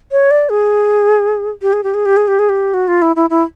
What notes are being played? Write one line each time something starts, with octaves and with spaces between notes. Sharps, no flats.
C#5
D5
G#4
G4
G#4
G4
G#4
G4
G#4
G4
G#4
G4
F#4
F4
E4
E4
E4